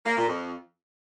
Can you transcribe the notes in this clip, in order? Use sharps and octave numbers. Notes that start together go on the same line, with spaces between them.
A#3
A#2
F2